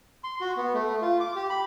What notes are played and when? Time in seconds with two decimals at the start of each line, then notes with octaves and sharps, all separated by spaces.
0.24 C6
0.41 F#4
0.56 B3
0.74 A3
1.02 F4
1.20 D6
1.36 G4
1.50 B5